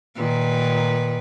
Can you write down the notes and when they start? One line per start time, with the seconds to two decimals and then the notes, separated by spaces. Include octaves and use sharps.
0.16 A#2 D#3 B4